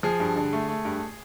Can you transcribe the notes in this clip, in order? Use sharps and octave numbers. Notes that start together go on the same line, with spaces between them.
F3 G#4
G2
D3
A3
A3
G2